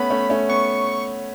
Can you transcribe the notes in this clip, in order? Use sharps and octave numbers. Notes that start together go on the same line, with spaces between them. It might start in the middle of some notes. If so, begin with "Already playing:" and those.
Already playing: A3 B3 C#4 B5
A3 C#4
A3 C#4
B3 C#6